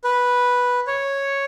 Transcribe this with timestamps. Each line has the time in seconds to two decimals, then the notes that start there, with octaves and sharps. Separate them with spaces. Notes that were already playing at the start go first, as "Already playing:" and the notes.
0.04 B4
0.87 C#5